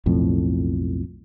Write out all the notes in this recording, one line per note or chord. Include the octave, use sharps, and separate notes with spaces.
B1 F2 A2